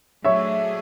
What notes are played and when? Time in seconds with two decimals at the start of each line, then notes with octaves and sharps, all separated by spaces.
0.25 F#3 A3 D4 G#4 C#5 E5